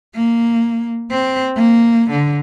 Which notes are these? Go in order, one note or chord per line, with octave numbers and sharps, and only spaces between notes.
A#3
C4
A#3
D3